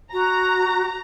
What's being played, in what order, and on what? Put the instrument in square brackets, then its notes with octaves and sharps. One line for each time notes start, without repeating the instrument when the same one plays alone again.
[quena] F#4 [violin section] A#5